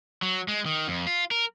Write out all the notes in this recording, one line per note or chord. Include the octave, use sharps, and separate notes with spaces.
F#3
G#3
D#3
F2
F4
A#4